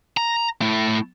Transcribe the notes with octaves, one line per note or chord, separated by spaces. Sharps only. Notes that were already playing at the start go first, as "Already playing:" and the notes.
A#5
A3 E4